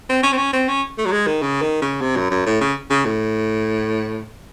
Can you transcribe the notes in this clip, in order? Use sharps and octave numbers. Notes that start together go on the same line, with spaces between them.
C4
C#4
C4
C#4
C4
C#4
A3
F#3
G#3
D#3
C#3
D#3
C#3
C3
F#2
F#2
A2
C#3
C#3
A2